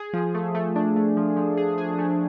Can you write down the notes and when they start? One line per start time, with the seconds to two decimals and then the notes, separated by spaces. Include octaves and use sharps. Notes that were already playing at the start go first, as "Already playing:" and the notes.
Already playing: G#4
0.13 F3
0.34 A3
0.55 A3
0.76 D4
0.96 A3
1.17 F3
1.36 F3
1.57 G#4
1.78 G#4
1.99 A3